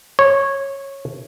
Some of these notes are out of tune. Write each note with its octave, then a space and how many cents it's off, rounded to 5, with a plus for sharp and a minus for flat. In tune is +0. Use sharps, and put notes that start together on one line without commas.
C#5 -15